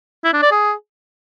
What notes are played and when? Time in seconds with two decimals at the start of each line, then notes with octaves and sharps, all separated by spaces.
0.24 E4
0.33 D4
0.42 D5
0.51 G#4